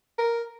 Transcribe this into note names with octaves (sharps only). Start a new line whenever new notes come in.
A#4